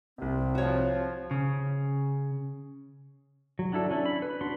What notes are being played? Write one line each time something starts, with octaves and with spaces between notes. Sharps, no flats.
C2 C3 C4
F3 F#4 C#5
C#3
F#3
F#3 D4 E4 A4
C#4 D4 E4
B5
B4
D4 F#4 B5 C6